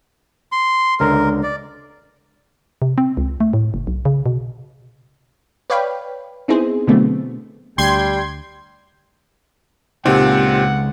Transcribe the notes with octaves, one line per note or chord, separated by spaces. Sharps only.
C6
C#2 D3 A#4
D5
C3
C4
C#2
A3
A2
F#1
B1
C#3
B2
B4 C#5 D5 F5 G5 B5
B3 C4 D#4 E4 G#4 C5
B2 D3 F#3 A3 B3 C4
D2 G3 G5 C6 G#6
C#2 A#2 C4 D#4 G4 F#5